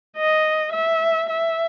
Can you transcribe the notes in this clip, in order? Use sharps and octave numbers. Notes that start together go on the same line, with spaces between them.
D#5
E5
E5